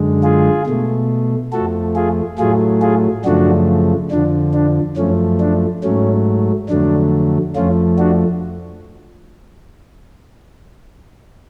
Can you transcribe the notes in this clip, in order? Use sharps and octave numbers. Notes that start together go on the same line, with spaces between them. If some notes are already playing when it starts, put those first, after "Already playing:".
Already playing: F#2 D3 G#3
F4 G#4
B2 A3
F2 F3 A3 F#4 A4
F4 G#4
A2 F#3 A3 F4 G#4
F4 G#4
F#2 C#3 F3 A3 D4 F#4
F2 D3 F3 D4
D4
F#2 F3 A3 C#4
D4
G#2 F#3 A3 C#4
F2 D3 F#3 A3 D4
F2 F3 A3 C#4 F4
D4 F#4